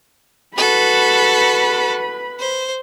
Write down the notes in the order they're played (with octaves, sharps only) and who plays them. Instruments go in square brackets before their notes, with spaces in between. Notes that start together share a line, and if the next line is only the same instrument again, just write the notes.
[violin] F#4 A4 [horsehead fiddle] B4 B5
[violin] C5